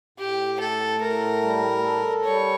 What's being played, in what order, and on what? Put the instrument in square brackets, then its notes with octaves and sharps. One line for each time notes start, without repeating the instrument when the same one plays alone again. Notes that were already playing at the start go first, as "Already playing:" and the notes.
[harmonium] A2 [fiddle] G4
[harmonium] A3 [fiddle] A4
[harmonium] A2 [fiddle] A#4
[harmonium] G3
A4
[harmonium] G3 [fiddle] C#5